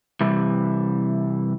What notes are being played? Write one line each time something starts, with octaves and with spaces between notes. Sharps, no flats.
C3 E3 G3